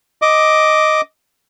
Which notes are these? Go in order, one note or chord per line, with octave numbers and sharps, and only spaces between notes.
D#5 D6